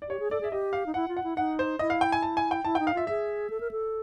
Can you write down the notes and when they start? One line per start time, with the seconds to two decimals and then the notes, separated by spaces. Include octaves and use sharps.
0.02 D5
0.09 G4 C#5
0.20 G#4
0.31 A4 D5
0.41 G#4 E5
0.52 G4 D#5
0.73 F5
0.86 D#4
0.94 E4 F#5
1.08 F4
1.17 F#5
1.24 E4
1.37 D#4 F#5
1.59 C5
1.79 E4 D#5
1.90 F5
2.01 G5
2.12 G#5
2.22 A5
2.37 G#5
2.51 G5
2.65 E4 A5
2.75 G5
2.80 D#4
2.87 F5
2.94 F4 E5
3.07 G#4 E5
3.50 A4
3.60 A#4
3.71 A4